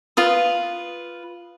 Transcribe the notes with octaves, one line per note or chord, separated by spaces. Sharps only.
F4 B4 D#6